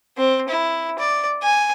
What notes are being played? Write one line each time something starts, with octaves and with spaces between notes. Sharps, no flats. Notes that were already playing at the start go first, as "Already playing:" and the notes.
C4
E4
D5
G#5